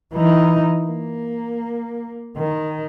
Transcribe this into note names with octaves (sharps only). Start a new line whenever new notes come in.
E3 D#4
A#3
D#3